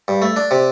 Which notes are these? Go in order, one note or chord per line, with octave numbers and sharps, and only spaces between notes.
G2
A3
D4
C3